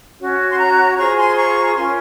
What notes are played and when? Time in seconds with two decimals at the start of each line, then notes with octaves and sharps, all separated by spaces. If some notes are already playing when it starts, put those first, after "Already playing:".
0.20 C#4 F#4 C#5
0.51 C6
0.58 F#5 A#5
0.97 F4 G#4 C5 A#5 C#6
1.16 G#5 C6
1.36 A#5 C#6
1.74 C#4 F4 A#4 C#5 G#5 C6